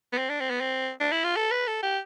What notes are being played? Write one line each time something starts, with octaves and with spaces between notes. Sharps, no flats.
B3
C4
D4
C4
B3
C4
D4
E4
F4
A4
B4
A4
G4